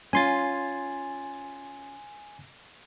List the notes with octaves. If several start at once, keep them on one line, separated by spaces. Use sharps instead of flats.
C#4 F4 G#5 C6 A6